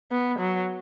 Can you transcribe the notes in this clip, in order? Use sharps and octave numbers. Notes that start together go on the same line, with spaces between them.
B3
F#3